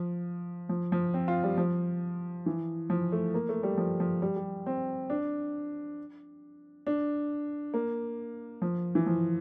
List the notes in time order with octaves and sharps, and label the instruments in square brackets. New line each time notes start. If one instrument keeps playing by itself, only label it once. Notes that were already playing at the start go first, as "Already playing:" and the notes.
Already playing: [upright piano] F3
F3
F3
C4
F4
G3
F3
E3
F3
A3
A#3
A3
G3
F3
F3
G3
G3
C4
D4
D4
A#3
F3
E3
F3